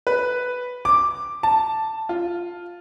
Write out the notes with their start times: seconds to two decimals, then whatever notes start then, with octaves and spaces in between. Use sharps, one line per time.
0.07 B4
0.85 D6
1.43 A5
2.09 F4